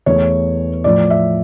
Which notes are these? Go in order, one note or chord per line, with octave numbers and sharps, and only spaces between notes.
E2 E3 A3 C#5
A2 F3 A3 D5
E5